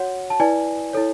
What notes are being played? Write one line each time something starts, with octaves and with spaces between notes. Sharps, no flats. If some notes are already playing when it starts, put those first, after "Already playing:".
Already playing: F#4 C#5 F#5
A5
E4 B4 D5 G#5
E4 A4 C#5